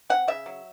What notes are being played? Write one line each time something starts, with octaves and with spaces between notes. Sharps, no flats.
C4 F#5
C#3 E5
F#3